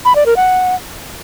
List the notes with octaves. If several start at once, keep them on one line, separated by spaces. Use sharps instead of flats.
B5
D5
A#4
F#5